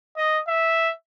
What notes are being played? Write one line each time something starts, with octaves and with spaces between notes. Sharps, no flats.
D#5
E5